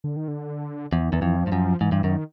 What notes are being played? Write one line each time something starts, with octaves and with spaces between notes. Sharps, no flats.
D3
D#3
D3
E2 F3
E3
D#3
E2 E3
F2
F3
G2
F#2
G#2 E3
G2
F#2 D#3